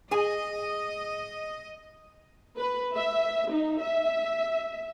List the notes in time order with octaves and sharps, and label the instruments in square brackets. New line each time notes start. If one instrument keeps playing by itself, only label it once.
[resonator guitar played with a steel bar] G#4 G#5 [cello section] D#5
[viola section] B4
E5
D#4
E5